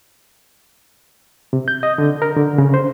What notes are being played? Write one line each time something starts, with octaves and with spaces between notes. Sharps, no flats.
C3
G6
D#5
D3
A#4
D3
C#3
C5